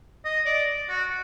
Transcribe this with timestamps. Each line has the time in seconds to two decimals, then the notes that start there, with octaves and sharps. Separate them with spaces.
0.25 D#5
0.46 D5
0.89 F#4